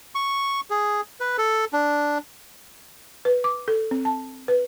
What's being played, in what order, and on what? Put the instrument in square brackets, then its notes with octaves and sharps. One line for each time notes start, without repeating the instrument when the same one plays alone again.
[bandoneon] C#6
G#4
B4
A4
D4
[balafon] B4
D6
A4
C4
A5
B4